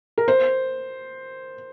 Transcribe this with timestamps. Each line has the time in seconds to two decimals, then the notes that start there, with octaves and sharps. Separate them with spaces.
0.18 A#4
0.28 C5